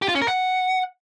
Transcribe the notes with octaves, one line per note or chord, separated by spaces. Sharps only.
G4
F4
C#4
A#4
F#5